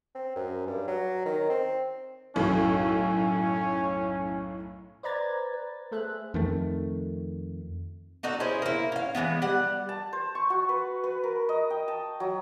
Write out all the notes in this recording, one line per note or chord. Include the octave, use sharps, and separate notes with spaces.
C4
F#2
G2
F#3
D#3
C4
B1 F#2 A2 C#4
B4 C5 D5 A#5 G#6 A6
B4
A3 G#4 A4 C5 E5 F#6
F2 D#3 A3
D4 D#4 F#4 A4
C#4 E4 G#4 C5
A#3 E4
C#4 F5
E3 F#3 G#3 B3
G3 F#5
A5
C5
C#6
F#4
B4
B4
A#4
D#5
G5
A5
F#3